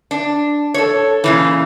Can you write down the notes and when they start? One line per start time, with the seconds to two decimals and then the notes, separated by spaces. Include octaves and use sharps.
0.11 D4
0.74 A4 C#5
1.24 A#2 C#3 E3